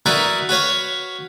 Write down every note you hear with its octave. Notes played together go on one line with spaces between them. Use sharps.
D#4 E4 F#4 A#4 B4 D5
F#4 B4 C#5 F5